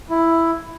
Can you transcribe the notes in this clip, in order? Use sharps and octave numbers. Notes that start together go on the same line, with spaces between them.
E4